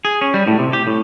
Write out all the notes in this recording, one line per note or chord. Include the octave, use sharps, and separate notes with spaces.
G#4
C#4
G3
A2
C3
G4
A2